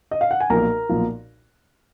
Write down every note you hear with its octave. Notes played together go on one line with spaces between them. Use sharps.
D#5
F5
F#5
G#5
B1 A#2 F3 A#4 A#5
B1 A#2 F3